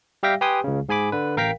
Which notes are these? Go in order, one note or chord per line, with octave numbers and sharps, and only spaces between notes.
G3 G4 E5 F5 G5 A#6
G4 B4 G5 G#5 C6 D#6
C#2 C#3
G#2 G#4 G#5 B5 D6
D3 B4
A1 A#4 F5 G5 A#5 B6